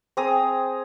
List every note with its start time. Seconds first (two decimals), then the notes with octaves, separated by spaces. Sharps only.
0.17 C4 G#4 A#5 D#6